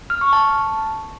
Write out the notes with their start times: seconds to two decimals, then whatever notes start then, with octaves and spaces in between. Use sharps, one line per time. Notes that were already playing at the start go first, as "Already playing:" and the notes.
0.10 F6
0.21 C#6
0.33 A5